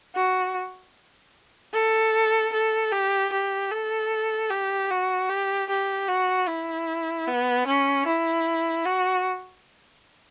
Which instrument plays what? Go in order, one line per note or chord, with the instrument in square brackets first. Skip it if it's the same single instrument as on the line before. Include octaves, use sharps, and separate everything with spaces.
[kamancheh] F#4
A4
A4
G4
G4
A4
G4
F#4
G4
G4
F#4
E4
B3
C#4
E4
F#4